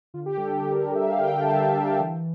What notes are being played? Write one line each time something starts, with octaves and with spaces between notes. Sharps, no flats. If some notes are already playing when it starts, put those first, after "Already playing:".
D3 F4
G4
G3 D4 A4
G4
D3 G4
A#4
G3 D4
E5
D3 F5
G5
G3 D4 G5
A5
D3 E5
G3 D4
E3